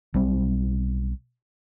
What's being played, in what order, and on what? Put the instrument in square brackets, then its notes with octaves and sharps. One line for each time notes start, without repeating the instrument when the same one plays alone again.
[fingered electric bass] B1 G3 C4